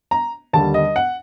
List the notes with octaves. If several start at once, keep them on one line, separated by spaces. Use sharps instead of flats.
A#5
D#2 D3 G3 A5
D#5
F#5